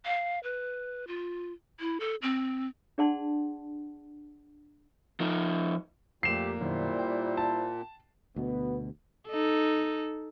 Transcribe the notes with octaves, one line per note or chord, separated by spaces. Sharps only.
F5
B4
F4
E4
A4
C4
D4 G#4 D5 F#5 A5 C6
F3 D#4
F2 A#2 A3 A#3 G4 C7 E7
F#2 B2 D#3 G3 E4 C5
G5
A5
D2 B2 B3
D#4 A4